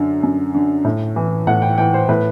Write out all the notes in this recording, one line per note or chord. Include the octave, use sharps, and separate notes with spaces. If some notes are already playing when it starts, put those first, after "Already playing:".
Already playing: F#2 D3
F#2
D3
A2
E3
A2 F#5
G5
E3 G5
C5
A2 B4